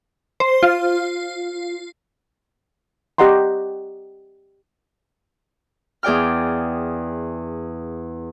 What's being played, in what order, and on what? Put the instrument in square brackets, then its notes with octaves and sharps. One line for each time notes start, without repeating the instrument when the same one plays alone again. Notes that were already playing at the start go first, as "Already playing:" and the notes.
[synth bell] C5
F4
[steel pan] G4 D#5 F#5 A#5 C6
[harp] E2 G#4 D5 G5 F6